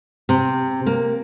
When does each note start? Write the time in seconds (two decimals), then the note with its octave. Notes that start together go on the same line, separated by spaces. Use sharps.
0.29 C3
0.86 A#3